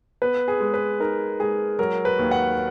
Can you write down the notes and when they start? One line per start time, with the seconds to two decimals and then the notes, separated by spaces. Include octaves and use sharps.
0.22 B3 B4
0.48 G#4
0.60 G#3
0.74 B4
1.00 D#4 A#4
1.40 G#3 G#4
1.79 F#3 A#4
2.05 B4
2.19 D#2
2.31 F#5